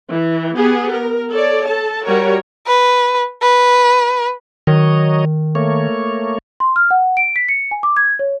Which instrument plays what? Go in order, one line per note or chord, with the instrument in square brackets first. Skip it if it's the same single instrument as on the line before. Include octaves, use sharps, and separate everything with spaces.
[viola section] E3
B3 G4 G#4
A#4
A4 C#5 D5
A4 A5
G3 F#4 A#4 C#5
[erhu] B4
B4
[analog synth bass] D#3 [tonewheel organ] F#3 C#5 D#5
[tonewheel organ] A3 A#3 C#5
[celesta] C6
F6
F#5
D7
B6
C#7
G#5
D6
G#6
C#5